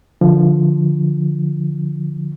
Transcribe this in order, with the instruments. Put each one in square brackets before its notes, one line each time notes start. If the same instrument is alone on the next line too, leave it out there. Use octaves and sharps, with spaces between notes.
[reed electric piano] D3 F3